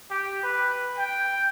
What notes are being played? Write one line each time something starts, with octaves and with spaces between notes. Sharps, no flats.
G4
B4
G5